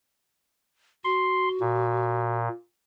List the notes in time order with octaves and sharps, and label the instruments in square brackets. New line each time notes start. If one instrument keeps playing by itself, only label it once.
[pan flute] F#4 [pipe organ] C6
[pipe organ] A#2